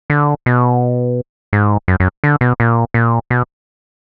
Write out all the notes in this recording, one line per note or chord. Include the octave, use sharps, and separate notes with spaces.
D3
B2
G#2
F#2
F#2
D3
B2
A#2
A#2
B2